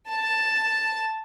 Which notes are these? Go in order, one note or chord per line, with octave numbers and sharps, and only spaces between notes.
A5